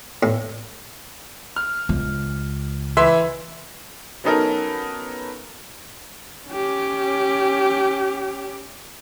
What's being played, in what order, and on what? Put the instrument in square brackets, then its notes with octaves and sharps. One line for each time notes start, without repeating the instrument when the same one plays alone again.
[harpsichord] A2
[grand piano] F6
[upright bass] C#2
[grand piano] E3 E5 C6
[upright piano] F#3 B3 C#4 D#4 A4 A#4
[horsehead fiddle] C#4 G4